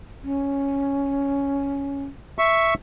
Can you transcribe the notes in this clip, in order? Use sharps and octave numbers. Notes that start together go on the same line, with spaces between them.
C#4
E5 C#6